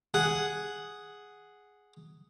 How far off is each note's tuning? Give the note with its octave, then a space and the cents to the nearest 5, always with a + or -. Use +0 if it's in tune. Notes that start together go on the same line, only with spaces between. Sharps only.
G#4 +0 F#5 +0